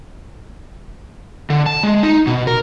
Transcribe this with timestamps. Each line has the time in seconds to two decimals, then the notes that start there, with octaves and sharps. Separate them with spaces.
1.50 D3
1.66 A5
1.83 G#3
2.03 D#4
2.27 B2
2.47 A#4